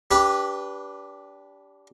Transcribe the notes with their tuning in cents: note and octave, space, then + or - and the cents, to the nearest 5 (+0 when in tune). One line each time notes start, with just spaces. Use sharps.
D4 -30 G4 +0 B4 -10